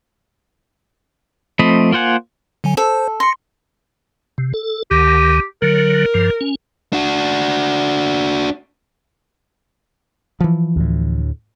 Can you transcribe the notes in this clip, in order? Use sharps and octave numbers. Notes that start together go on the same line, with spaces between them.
F3 A3 C4 D#5 B5
A#3 F4 C5 F#5 G#5
D3 F#3 G#5
A4 C5
C6 A#6 C#7
C3
A4
D2 D#3 G4
D3 F#3 A#4
G2 F3
C#4
D4 F#4
E3 F3
D2 A2